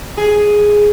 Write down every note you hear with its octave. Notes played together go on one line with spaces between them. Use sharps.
G#4